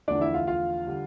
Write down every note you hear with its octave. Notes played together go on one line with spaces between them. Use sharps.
E2 D3 F3 A3 D4 D5
E4 E5
F4 F5
F4 F5
D3 G3